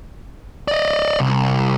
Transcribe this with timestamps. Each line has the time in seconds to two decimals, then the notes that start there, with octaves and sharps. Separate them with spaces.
0.68 D5 D#5
1.20 C2